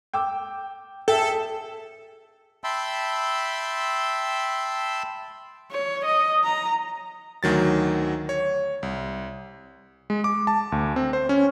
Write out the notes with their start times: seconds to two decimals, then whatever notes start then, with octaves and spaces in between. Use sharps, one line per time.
0.14 G5 D6 E6
1.08 G#4 A4 E5 G5
2.64 E5 G5 A5 B5 C6 E6
5.71 C#5
6.05 D#5
6.44 A#5
7.43 D2 D#3 F#3 A6
8.29 C#5
8.83 C2
10.10 G#3
10.24 D6
10.47 A5
10.72 D2
10.96 C4
11.13 C5
11.29 C#4